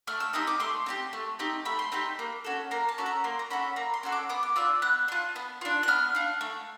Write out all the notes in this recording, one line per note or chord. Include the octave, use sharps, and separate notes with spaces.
A3 F6
E6
C4 D#4 G4 D#6
D6
A3 C6
C4 D#4 G4
A3
C4 D#4 G4
A3 B5
C6
C4 D#4 G4 B5
A#3
C#4 F#4 A4
A#3 A#5
A5
C#4 F#4 A4
A#5
A#3 C6
A#5
C#4 F#4 A4 B5
A#3 A#5
C6
C#4 F#4 A4
D6
B3 D6
D6
D4 F4 E6
B3 F#6
D4 F4
B3
D4 F4
F#6
B3 F6
D4 F4
A3